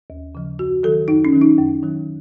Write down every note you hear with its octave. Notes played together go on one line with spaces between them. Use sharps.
D#2
C#3 F3
F#2 F#4
D#3 F#3 A4
F#2 D#4
C#4
D#3 F#3
D#4
F#2
D#3 F#3